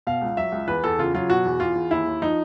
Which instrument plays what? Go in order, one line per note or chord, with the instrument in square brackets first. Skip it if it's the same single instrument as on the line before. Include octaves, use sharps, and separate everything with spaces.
[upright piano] B2 F5
C#2
F#3 E5
C#2
E2 B4
E2 A4
C#3 F4
F#3 F4
B2 F#4
E2
E2 F4
E2
D#2 E4
D#2
F3 D#4